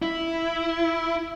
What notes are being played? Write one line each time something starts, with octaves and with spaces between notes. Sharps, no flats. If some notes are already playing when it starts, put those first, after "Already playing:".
E4